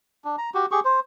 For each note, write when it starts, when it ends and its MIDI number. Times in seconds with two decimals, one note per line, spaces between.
0.25 0.36 62
0.38 0.50 82
0.54 0.66 66
0.54 0.66 67
0.71 0.80 67
0.71 0.80 68
0.71 0.80 85
0.85 1.00 72